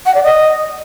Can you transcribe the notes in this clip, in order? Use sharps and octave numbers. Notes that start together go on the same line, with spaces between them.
F#5
D5
D#5